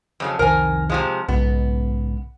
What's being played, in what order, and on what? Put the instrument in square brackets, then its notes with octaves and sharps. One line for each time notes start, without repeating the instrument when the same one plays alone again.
[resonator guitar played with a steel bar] F2 C#3 F#3
[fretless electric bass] C2 F2 D#3 [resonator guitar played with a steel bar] A#4 G#5 [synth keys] C5
[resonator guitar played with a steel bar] C3 F3 G#3 [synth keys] F5
[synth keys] B1 [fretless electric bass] G#2 C#3 [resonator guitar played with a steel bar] B3